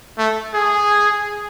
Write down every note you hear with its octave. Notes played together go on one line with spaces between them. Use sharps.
A3
G#4